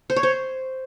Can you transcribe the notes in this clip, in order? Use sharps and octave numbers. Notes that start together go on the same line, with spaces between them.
C5
C#5
C5